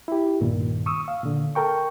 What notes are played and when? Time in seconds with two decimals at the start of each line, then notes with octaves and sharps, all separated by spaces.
0.08 E4 G4
0.40 C2 G2 A#2 D#3
0.86 C#6 D#6 E6
1.08 F5
1.24 A#2 D3
1.55 A4 A#4 G5 C#6